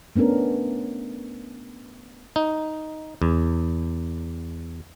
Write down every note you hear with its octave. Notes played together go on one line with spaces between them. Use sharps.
A3 B3 C#4 D4 A#4
D#4
E2